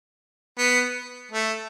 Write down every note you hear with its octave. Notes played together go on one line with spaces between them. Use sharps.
B3
A3